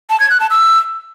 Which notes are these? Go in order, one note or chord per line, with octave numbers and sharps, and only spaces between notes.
A5
G#6
F#6
A5
E6